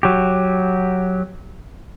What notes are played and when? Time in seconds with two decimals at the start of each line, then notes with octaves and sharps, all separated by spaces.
0.03 F#3 G4